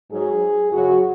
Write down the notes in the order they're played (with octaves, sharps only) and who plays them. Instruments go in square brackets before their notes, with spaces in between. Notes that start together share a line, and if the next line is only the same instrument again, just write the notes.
[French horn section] G#2 F#3 G#4
F#2 C#3 F#3 F#4